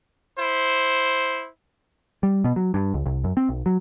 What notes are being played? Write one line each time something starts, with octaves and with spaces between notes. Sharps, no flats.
E4 C5
G3
B2
F#3
G2
C#2
C2
F#2
C4
B1
F#3